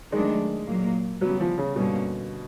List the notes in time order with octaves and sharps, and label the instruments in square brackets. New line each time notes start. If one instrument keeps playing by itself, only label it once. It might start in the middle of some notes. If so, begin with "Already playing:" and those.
[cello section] D#3 F#3 A3 D4 [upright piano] G#3
[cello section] A#2 F#3 A#3
[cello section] C#3 E3 G3 B3 [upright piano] F#3
[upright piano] F3
C#3
[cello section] G2 D3 G3 A#3 C#4 [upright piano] B2